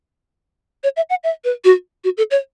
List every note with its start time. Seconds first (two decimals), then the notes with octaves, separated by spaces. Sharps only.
0.84 C#5
0.97 E5
1.10 F#5
1.24 E5
1.44 B4
1.64 F#4
2.04 F#4
2.17 A4
2.31 C#5